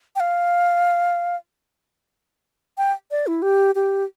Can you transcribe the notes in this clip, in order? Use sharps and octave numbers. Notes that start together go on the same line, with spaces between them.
G5
F5
G5
D5
E4
G4
G4